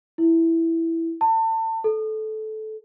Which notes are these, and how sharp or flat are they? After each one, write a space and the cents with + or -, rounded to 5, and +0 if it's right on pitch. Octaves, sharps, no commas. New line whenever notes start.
E4 +0
A5 +30
A4 -15